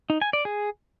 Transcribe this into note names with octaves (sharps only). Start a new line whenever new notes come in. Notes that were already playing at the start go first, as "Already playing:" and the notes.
D#4
G#5
D5
G#4